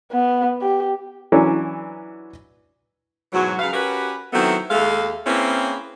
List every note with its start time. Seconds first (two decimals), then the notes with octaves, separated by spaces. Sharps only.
0.12 B3
0.61 G4
1.32 E3 F#3 C#4 D4
3.33 G#2 B2 E3 F#3
3.59 C#3 F#3 B4 F5
3.73 C#4 F#4 G4 A#4 B4
4.33 D#3 F#3 A3 B3 C4 E4
4.70 D#2 G#3 A3 F5
5.27 A#3 C4 C#4 E4 G#4 B4